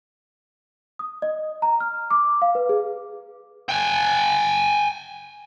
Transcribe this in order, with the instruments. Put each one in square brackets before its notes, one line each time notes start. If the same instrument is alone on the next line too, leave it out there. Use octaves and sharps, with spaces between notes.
[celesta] D#6
D#5
A#5
F6
D6
F5
B4
G#4
[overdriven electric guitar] G5 G#5